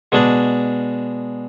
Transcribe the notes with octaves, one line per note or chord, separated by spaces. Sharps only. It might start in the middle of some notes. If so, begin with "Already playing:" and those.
B2 G#3 D4 G#4 D5